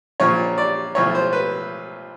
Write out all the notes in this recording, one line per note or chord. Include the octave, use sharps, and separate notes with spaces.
A#1 A#2 F3 C#5
D5
B1 A2 F3 C#5
C5
B4